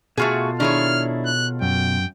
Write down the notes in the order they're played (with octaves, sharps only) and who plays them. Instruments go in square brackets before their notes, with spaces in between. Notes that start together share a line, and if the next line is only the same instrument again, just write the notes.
[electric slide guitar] B2 F4 A4 [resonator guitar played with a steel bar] A3 F#4 G#4
[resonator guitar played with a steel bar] D#3 G#4 C#5 [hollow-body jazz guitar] D4 E4 [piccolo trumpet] F6
[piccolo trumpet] F#6
[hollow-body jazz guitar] F#2 [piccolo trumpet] G5